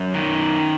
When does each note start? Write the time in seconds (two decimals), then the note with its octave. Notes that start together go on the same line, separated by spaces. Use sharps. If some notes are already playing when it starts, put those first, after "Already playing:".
Already playing: F#2
0.14 D#3